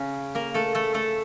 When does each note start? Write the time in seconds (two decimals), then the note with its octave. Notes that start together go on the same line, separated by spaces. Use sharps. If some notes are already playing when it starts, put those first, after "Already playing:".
Already playing: C#3 C#4
0.35 A#3 A#4
0.54 A3 A4
0.75 A3 A4
0.94 A3 A4